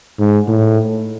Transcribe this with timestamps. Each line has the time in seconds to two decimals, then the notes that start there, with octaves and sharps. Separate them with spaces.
0.19 G#2
0.48 A2